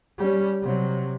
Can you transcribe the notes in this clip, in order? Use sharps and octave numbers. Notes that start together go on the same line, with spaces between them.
G3 C#4
C3 F#3